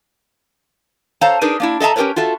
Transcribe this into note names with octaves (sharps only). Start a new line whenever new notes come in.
A4 C5 C#5 F5 A5 A#5
D4 D#4 G#4 A#4 B4
A#3 D4 E4
A4 D#5 E5 A5 A#5
C#4 G4 G#4 A#4 B4 C#5
F4 F#4 A4 E5